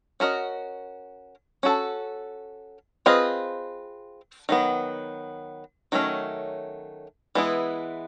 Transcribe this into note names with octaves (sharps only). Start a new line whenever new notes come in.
C#4 F#4 A#4 D#5
C#4 F#4 A4
C4 F4 G#4 B4 D#5
D#3 F#3 B3
D#3 F#3 A3 C#4
E3 G#3 B3 E4